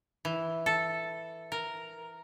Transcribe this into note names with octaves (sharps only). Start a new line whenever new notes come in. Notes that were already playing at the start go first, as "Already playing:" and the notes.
E3
A4
A#4